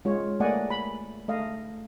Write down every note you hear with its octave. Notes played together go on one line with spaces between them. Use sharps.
G#3 F4 C#5
A3 A#3 D5 D#5 F#5 G#5
B5
A3 D#5 F5